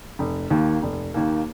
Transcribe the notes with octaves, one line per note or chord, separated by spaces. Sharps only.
F1
D#2 D#3 A#3
F1
D#2 D#3 A#3